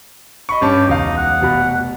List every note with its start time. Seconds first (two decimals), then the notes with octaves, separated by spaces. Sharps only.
0.49 D#5 B5 C#6
0.61 G2 C#4 G4 A5
0.88 E1 C#2 D#4 F5
1.17 F#5
1.41 F1 B2 B5